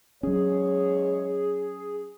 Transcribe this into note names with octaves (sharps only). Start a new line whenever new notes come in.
E2 F#3 G#3 C#4 G#4 C#5